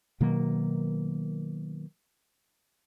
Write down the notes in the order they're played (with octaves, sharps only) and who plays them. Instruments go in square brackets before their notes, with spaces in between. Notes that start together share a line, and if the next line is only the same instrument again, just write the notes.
[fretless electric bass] B2 D#3 F#3 A#3